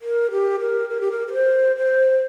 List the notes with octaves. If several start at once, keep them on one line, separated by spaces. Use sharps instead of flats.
A#4
G4
A#4
A#4
G4
A#4
A#4
C5
C5